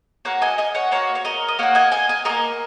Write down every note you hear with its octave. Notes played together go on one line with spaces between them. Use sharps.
A#3 F#4 C#5 F#5
D#5 G#5
D#5 G#5
C#5 F#5
A#3 F#4 C#5
C#5
A#4 D#5
D#5
A#3 F#4 C#5 F#5
D#5 G#5
D#5 G#5
D#5 G#5
A#3 F#4 A#4 D#5